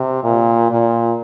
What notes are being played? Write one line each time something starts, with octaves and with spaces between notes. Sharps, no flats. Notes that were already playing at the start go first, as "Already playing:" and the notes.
Already playing: C3
A#2
A#2